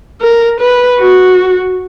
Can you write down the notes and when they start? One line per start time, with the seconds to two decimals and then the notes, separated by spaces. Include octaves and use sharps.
0.22 A#4
0.60 B4
1.00 F#4